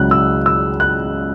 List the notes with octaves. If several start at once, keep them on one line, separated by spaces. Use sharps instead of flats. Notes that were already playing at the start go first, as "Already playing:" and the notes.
Already playing: C#2 C#3 F#3 C#4 F#6
E6
E6
F#6